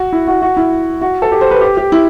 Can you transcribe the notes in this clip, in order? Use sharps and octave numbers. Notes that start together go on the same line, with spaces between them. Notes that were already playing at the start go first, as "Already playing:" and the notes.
Already playing: F#4
E4
F#4
F#4
E4
F#4
A4
G4
C5
B4
G4
G4
E4